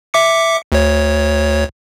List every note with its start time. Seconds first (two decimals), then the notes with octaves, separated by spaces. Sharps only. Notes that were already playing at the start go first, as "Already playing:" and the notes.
0.14 E5 D6 C#7
0.72 D2 C#5